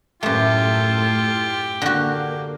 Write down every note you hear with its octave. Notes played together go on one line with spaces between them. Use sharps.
F#2 A2 A3 F4 G4 A4
D3 A#3 F#4